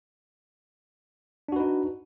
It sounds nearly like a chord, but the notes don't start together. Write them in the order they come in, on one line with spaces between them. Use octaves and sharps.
D4 F#4 B4 D#4